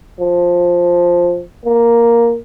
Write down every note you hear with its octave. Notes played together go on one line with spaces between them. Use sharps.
F3
A#3